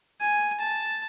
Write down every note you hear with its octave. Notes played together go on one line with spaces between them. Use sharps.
G#5
A5